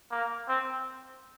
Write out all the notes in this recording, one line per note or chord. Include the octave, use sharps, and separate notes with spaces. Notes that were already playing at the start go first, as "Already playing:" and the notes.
A#3
C4